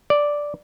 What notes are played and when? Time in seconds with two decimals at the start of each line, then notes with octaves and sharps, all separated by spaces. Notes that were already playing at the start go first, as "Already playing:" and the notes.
0.10 D5